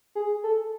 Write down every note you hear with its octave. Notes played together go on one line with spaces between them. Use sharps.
G#4
A4